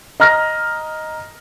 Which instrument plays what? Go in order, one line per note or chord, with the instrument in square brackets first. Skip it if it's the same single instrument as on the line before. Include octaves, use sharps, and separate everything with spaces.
[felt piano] D#5 A#5 F6 A#6